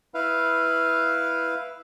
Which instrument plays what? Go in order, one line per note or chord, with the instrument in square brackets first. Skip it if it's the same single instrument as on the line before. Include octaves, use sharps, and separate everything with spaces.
[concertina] E4 B4 F5